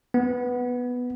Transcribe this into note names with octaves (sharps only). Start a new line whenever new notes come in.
B3